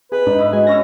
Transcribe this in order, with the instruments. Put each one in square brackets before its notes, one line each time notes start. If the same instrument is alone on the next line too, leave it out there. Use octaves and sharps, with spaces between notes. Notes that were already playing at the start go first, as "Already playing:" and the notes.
[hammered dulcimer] C3 [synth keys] G#4 [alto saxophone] B4
[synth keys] G#2 D4 [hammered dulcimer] D#4
[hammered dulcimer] E4 D#5
[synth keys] G#3 G#4 G#5 [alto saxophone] F#4
[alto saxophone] C#4 [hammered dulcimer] E4 C#5 E5 [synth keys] A#6